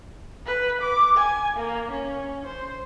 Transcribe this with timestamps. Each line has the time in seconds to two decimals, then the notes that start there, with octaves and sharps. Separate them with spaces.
0.47 B4
0.81 D6
1.17 G#5
1.57 A#3
1.91 C#4
2.46 C5